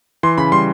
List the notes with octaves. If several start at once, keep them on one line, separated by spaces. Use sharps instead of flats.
E3 C6
C#3 B5
G3 C6